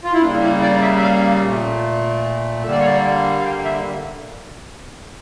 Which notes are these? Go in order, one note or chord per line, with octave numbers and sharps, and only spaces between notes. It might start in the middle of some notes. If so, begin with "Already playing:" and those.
F4
E4
C#3 G3 A#3 D4
E4
D5
E5
E5
F5
A#2 A3
D3 G3 A#3 E5
D5
C#5
D5
F5
G5
E5